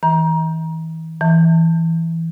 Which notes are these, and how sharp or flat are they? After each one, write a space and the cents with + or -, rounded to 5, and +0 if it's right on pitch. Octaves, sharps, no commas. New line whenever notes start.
E3 -35 A#5 +25
E3 +0 A5 +40